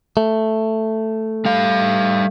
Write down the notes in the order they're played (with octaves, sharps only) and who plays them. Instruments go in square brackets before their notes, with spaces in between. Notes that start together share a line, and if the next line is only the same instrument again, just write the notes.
[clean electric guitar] A3
[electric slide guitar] G3 F5